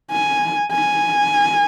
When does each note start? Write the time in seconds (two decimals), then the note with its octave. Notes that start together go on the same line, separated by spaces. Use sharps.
0.12 G#5
0.72 G#5